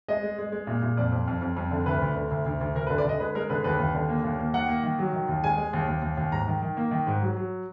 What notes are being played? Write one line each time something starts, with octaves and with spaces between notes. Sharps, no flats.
G#3 D#5
G#3
G#3
G#3
A#2
A#2
F2 D5
F2
F2
F2
F2
D3
D2 B4
D2
D3
D2
D2
D2
D2 A#4
B4
D3
D5
D3 D#5
G#3 B4
G#3 A#4
D3 B4
D#2 B4
D#2
D3
A#3
D#2
A#3
D#3 F#5
A#3
D#3
F#3
D#3
D#2
G#3 G#5
G#3
D#2
D#2
D#2
D#2
G#2 A#5
D#3
D#3
A#3
D#3
G#2
F#3
F#3